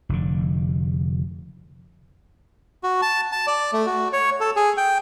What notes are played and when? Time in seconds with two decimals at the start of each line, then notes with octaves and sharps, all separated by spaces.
0.09 F1 D3
2.83 F#4
3.02 A5
3.32 A5
3.47 D5
3.73 A3
3.86 F#4
4.13 C#5
4.40 A4
4.56 G#4
4.77 G5